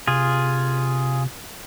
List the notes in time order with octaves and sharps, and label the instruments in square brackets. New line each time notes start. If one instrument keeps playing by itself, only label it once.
[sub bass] C3 [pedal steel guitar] F4 G#4